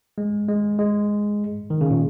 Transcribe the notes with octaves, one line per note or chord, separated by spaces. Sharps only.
G#3
G#3
G#3
D#3
C#3
A#2